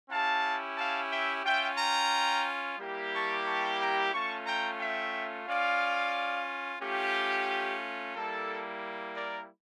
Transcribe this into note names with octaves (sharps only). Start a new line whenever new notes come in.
C#4 E4 G4 F5 A5
F5 A5
E5 G5
C#4 F4 E5 G5
G5 A#5
G3 A#3 E4 G4
A5 C#6
A5 C#6
G5 A#5
A3 C#4 F4 A5 C#6
G5 A#5
E5 G5
C#4 F4 D5 F5
A3 C#4 F4 G4
G3 A#3 E4 A4
A#4 D5